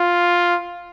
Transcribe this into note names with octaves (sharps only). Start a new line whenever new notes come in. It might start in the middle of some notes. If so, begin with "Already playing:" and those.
Already playing: F4